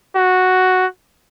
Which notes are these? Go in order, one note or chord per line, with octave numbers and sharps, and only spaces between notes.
F#4